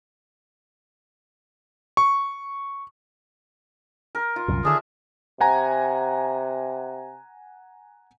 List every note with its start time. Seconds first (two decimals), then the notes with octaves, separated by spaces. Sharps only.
1.97 C#6
4.15 A#4
4.36 F4
4.48 C2 F#2 A#2
4.65 D3 D#3 D4 G#4 E5
5.41 C3 F#5 G#5 A#5